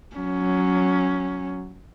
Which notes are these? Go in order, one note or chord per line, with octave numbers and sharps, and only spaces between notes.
F#3 C#4